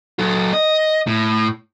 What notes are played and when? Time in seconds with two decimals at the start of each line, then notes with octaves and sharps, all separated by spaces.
0.19 F#3 A4
0.53 D#5
1.07 A2